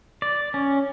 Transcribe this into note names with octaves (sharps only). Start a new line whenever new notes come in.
D5
C#4